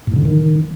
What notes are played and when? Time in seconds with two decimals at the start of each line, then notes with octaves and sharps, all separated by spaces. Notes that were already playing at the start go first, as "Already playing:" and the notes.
0.07 A2
0.16 D3
0.25 D#3